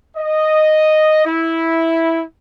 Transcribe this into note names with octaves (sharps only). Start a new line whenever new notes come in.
D#5
E4